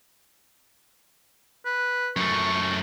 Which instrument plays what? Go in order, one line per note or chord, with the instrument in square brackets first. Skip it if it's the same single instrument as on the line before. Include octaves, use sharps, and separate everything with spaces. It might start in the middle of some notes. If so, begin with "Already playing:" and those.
[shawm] B4
[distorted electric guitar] F#2 A3 [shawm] C#6